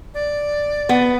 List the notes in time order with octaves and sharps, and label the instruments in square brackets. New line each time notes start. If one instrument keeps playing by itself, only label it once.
[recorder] D5
[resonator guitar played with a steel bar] B3